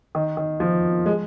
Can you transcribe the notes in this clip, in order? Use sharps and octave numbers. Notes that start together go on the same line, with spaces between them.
D#3
D#3
F3
G#3